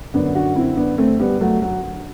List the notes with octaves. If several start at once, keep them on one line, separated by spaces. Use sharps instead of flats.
F#2 D3 B3 D4
D4 F#4
C4 E4
B3 D4
A3 C4
G3 B3
F#3 A3
F#3